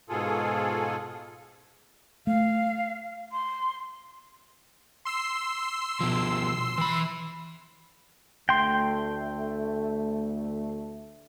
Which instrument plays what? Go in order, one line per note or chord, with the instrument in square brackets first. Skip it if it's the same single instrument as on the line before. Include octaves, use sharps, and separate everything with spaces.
[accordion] G#2 B2 F4 G#4 A4
[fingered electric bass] A3 [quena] F5
[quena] C6
[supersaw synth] C6 E6 C7
[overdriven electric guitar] B2 F3
E3 B5
[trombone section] D2 A3 [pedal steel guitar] G5 C6